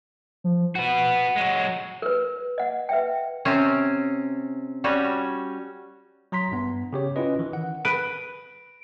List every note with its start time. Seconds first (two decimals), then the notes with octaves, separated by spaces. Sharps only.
0.44 F3
0.75 B3 F#4 F#5
1.36 F#3 G#3
2.02 A#4 B4
2.58 D#5 F#5
2.89 B4 E5 G5
3.45 C3 C4 C#4
4.84 G3 C#4 F#4
6.32 F#3 A#5 C6 B6
6.52 G2 B3
6.93 C#3 G4 C#5
7.16 C#4 E4 F4 B4 D#5
7.39 D#3 E3
7.53 F#5
7.85 B4 D7